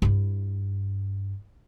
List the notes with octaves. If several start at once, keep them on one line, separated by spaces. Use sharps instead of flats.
G2 E4